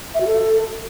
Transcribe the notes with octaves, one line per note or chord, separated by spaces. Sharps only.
E5
F#4
A4